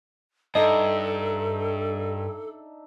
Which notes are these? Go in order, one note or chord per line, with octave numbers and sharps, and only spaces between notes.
G2 D4 D#4 A4 D#5 E5